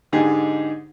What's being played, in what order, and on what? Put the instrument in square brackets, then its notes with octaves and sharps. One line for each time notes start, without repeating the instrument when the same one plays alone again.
[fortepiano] G#2 D3 D#4 G4 G#4